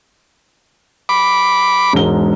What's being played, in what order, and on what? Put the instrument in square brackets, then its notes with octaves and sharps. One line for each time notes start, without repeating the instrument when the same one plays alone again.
[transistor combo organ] B5 D6
[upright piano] E1 G#2 G7